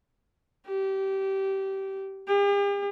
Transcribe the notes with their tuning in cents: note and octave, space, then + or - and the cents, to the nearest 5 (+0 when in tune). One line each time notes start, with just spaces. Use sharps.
G4 -20
G4 +45